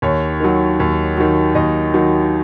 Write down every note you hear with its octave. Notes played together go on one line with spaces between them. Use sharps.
D#2 C#5
D#3 F#3
D#2
D#3 F#3
D#2 D#5
D#3 F#3